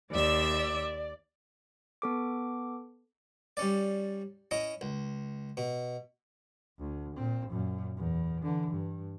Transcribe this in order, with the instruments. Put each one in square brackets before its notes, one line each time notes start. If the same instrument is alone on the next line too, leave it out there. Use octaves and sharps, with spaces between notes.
[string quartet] D#2 E5 E6 [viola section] D5
[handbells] B3 A4 D6
[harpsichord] G3 C#4 D5
C#4 E4 D#5
C#2
B2
[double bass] D2
A#2 C4
F#2 A#2
E2
D3 E3
G2